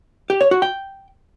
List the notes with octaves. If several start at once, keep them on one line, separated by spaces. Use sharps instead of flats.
G4
C#5
F#4
G5